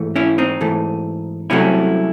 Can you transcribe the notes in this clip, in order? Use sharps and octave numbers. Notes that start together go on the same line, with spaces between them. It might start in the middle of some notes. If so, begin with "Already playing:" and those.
Already playing: G#2 E3 A3
C#4 E4
C4 D#4
G#2 E3 A3
C2 C3 F#3 A3 C#4 E4